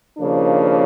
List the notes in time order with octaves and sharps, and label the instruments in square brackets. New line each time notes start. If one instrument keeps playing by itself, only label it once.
[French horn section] D#2 C#3 F3 A#3 D4